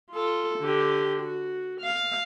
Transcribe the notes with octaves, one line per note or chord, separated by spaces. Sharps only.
F4 A4
D3 G4
F#4
F5